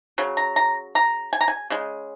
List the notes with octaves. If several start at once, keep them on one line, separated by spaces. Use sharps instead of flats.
C#3 F#3
A#5
A#5
A#5
G#5
A#5
G#5
C#3 G#3